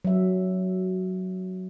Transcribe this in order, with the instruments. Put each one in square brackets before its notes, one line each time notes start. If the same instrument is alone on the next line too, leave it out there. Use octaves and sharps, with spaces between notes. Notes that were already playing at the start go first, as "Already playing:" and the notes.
[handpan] F#3 E5